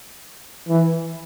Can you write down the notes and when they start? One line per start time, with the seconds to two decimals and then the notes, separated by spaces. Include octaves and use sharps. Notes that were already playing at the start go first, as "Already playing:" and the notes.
0.68 E3